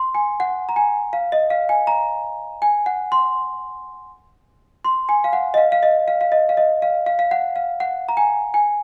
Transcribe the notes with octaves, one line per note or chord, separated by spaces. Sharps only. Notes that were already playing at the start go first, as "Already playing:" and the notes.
Already playing: C6
G#5
F#5
A#5
G#5
F5
D#5
F5
G#5
A#5
G#5
F#5
C6
C6
G#5
F5
F#5
D#5
F5
F5
D#5
F5
F5
D#5
F5
D#5
F5
F5
F5
F#5
F5
F#5
A#5
G#5
G#5